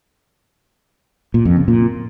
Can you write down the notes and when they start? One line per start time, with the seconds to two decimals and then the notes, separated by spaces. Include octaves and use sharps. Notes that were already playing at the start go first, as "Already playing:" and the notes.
1.34 A#2
1.45 F2
1.57 C#3
1.68 A#2